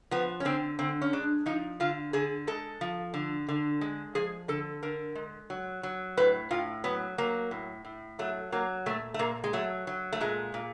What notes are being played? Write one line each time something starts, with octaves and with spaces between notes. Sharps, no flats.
F3 B3
C#4
D3 C4
D3 C4
C#4
G#3 D4
F3 D#4
D3 F4
D3 G#4
G#3 A4
F3
D3
D3
G#3
F3 G#4
D3 A4
D3 A#4
G#3
F#3
F#3
A2 B4
A2 F4
F#3 B3
F#3 A#3
A2
A2
F#3 A3
F#3 A#3
A#2 A3
A3
A#2 A#3
G#3
F#3 A3
F#3
A3
A#2 G#3
A#2